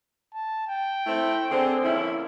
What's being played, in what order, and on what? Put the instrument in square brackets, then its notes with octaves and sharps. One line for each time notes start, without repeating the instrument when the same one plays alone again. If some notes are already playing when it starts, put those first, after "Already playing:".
[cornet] A5
G5
[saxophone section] A3 C4 E4
[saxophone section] D3 C4 [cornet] G#4
[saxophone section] F3 C#4 E4 [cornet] A#3